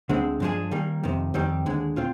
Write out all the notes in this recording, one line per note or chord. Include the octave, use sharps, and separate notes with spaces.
D2 D3 G#3 C4
G2 F3 G#3 D4 G#4
D#3 G3 A#3
F2 C3 D#3
F2 D#3 G3 C4 G4
D#2 D3 G#3
A#2 C4 F4